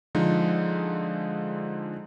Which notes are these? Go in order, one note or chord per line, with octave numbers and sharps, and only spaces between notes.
D3 F3 G#3 D#4